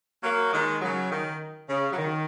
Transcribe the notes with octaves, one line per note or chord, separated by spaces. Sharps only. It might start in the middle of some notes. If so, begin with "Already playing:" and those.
F#3 A#3
D#3 G#3
C#3 F#3
D#3
C#3
F#3
D#3